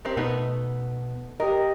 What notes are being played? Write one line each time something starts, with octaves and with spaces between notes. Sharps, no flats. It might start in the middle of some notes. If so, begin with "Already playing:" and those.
C4 G4 A#4
B2 A3 B3 D#4
G4 A#4 D#5